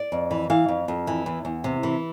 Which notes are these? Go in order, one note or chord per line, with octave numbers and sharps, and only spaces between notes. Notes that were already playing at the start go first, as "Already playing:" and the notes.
Already playing: D5
F2
E3
E3 F5
F2
F2
E3
E2
E2
C3
E3